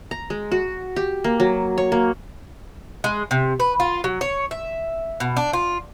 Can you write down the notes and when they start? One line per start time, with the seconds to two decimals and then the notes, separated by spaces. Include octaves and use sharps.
0.11 A#5
0.30 G#3
0.52 F#4
0.96 G4
1.24 A#3
1.40 F#3
1.78 C#5
1.92 A#3
3.04 G#3
3.31 C3
3.60 B4
3.80 F4
4.04 F#3
4.21 C#5
4.51 E5
5.20 B2
5.37 D4
5.53 F4